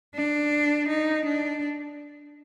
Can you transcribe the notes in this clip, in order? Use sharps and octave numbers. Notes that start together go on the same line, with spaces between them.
D4
D#4
D4